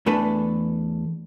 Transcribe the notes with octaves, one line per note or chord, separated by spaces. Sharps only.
E2 E3 A3 D4 A4 B4